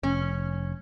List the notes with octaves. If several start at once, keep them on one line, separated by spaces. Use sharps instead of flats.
F1 C#4